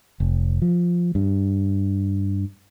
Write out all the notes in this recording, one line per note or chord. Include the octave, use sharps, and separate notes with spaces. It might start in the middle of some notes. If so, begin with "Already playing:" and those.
F1
F3
G2